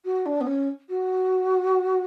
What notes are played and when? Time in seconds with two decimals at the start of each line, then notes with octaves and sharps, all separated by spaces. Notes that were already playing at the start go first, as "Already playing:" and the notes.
0.04 F#4
0.25 D4
0.40 B3
0.46 C#4
0.89 F#4